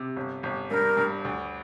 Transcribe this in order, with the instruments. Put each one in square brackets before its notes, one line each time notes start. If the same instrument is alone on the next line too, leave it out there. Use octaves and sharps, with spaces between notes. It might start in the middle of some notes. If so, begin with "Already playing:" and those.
Already playing: [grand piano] C3
G1
G1
[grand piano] G2 [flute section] A#4
[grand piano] G2
D2